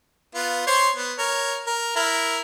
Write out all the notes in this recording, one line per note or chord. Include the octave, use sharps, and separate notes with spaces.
B3 F4
C5 C#5 C6
B3
A#4 C#5
A#4
E4 A#4